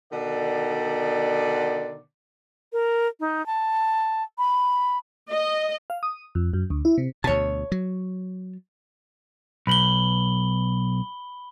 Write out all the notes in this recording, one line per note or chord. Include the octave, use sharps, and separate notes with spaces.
B2 D3 D#3 D5
A#4
D#4
A5
B5
D#5
F5
D#6
F2
F#2
D2
E4
C3
D2 B2 C#5 A5
F#3
B1 B5 F#7 G7